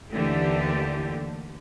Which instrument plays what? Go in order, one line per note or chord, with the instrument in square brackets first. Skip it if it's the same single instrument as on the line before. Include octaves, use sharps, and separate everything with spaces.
[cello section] D#2 D3 E3 A3 G4